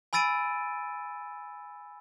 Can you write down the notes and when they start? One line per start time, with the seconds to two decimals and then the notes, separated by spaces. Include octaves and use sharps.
0.13 G#5 B5 E6 A6 D7 D#7